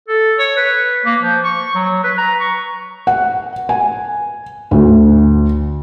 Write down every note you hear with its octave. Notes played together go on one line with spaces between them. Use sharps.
A4
C#5
B4
A#3
F3
C#6
F#3
B4
A#5
C#6
F#5
G#5
D2